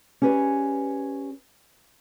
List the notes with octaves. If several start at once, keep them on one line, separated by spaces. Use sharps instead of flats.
C#4 G4 G#4 B4 D5